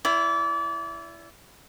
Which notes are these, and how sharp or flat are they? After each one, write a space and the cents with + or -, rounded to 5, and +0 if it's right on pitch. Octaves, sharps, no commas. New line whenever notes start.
E4 +15 D5 -30